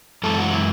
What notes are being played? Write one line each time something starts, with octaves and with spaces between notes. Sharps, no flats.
F#2 E3 G#3 A4
F#4
E4